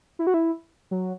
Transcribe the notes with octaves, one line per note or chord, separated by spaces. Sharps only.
E4
F#4
E4
F#3